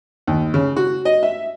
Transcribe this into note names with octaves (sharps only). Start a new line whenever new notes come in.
D#2
C#3
F#4
D#5
E5